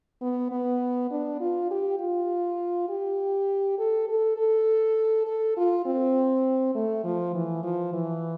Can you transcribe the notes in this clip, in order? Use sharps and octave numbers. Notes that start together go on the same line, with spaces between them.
B3
B3
D4
F4
G4
F4
G4
A4
A4
A4
A4
F4
C4
A3
F3
E3
F3
E3